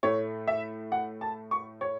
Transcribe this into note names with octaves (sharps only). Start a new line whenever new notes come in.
A2 A3 C#5
E5
F#5
A5
C#6
C#5